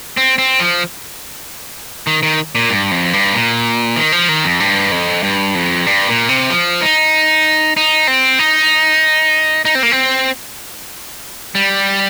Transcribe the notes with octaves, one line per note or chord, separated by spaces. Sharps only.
C4
C4
F3
D#3
D#3
A#2
G2
F2
G2
A#2
D#3
F3
D#3
F2
G2
F2
G2
F2
G2
A#2
C3
F3
D#4
D#4
C4
D#4
D#4
C4
A#3
C4
G3